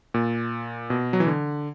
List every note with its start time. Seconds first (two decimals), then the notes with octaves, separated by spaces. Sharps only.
0.14 A#2
0.90 B2
1.13 F#3
1.20 E3
1.27 D3